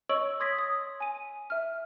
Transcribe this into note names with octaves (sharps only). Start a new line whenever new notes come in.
C#5 D#5 C#6 E6 D7 F#7
C6 D#6 G#6 A#6 B6
D#6
G#5 D#7
E5 F6